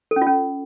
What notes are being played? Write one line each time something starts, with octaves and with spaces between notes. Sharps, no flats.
A4
C#4
F4
C#4